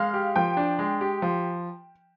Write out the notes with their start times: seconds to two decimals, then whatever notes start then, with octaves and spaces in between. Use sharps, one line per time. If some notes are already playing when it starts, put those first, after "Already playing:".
Already playing: G#3 F5
0.13 G4
0.36 F3 G5
0.57 D4
0.79 G#3
1.01 G4
1.22 F3